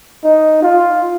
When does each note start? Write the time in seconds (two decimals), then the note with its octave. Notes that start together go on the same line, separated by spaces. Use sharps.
0.24 D#4
0.62 F4